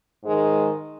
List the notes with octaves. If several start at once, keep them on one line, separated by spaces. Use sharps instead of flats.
G#2 D#3 G#3